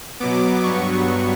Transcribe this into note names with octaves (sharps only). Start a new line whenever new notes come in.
B2 F#3 B3 D6
G2 F#3 B3 C#6